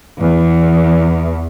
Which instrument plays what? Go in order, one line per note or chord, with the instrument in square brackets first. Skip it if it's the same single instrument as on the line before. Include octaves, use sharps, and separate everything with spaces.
[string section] E2